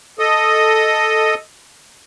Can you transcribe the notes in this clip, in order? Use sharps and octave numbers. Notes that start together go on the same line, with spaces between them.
A4 D#5 D#6